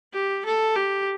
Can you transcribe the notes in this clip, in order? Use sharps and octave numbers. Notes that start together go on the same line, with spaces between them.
G4
A4
G4